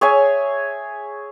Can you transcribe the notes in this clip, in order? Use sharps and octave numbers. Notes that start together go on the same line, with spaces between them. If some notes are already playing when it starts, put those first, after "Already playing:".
G#4 C#5 E5 G#5